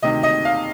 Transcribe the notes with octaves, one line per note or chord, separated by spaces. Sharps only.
D2 C3 D#3 D#5
D#5
F5